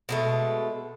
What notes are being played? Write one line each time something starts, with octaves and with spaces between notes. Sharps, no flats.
B2 G#3 A3